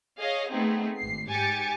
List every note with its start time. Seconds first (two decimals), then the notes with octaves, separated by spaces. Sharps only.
0.19 G#4 C#5 D#5 F5
0.50 A3 B3 C4 D#4 G#4
0.98 G#1 C7
1.31 G#2 G4 G#5 A6 C#7